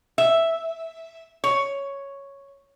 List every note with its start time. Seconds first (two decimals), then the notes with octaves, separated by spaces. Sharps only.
0.18 E5
1.44 C#5